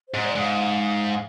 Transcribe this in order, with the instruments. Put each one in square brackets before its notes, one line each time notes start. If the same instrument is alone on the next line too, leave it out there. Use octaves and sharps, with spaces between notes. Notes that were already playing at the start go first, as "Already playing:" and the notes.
[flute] C5
[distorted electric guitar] G#2
[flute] D5
[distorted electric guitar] G#2
[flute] F5